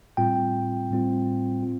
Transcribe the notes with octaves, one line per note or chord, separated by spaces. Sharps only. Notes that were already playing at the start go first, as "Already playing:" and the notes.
A2 G3 C4 F4 G5
A2 G3 C4 F4
C4 F4